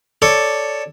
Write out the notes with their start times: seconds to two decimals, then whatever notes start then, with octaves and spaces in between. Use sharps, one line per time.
0.22 A4 C#5 D5